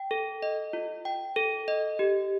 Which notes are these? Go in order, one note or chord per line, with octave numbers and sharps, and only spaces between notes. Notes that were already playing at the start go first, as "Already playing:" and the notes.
Already playing: G5
A4
D#5
F4
G5
A4
D#5
G4